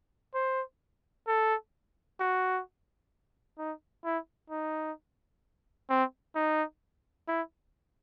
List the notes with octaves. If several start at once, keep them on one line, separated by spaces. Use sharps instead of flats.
C5
A4
F#4
D#4
E4
D#4
C4
D#4
E4